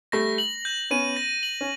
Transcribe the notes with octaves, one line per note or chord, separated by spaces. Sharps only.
G3 A3 A#6
F#7
G6
B3 C#4 D#7
A#6
F#7
C#4